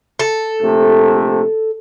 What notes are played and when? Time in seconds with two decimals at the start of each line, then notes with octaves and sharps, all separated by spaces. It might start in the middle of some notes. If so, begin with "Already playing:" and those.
0.19 A4
0.61 A#1 C3 A3